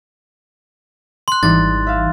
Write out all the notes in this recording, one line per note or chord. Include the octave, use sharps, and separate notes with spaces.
C6 F#6
G#1 E3 G3 D#4 A6
E5 F5